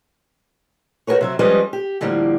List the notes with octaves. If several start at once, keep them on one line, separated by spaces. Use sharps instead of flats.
F#4 G#4 A#4 B4 C#5
C3 F#3 E5
F3 G3 G#3 C#4 B4 D#5
G4
A2 D3 F3 G3 A#3